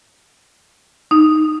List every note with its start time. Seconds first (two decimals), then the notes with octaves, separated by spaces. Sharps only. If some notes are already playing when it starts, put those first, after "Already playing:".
1.11 D#4